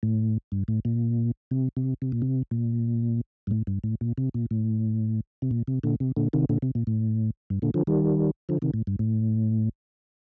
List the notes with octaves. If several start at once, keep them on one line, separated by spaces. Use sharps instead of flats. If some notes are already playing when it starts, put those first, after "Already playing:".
A2
G2
A2
A#2
C3
C3
C3
A#2
C3
A#2
G2
A2
G2
A2
A#2
C3
A#2
A2
C3
A#2
C3
A#2 D3
C3
A#2 D3
C3 D#3
A#2 D3
C3
A#2
A2
G2
A#2 D3
D3 F3
D#3 G3
D3 F3
C3 D#3
A2
G2
A2